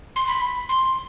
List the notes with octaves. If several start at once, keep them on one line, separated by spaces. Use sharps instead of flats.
C6
B5
C6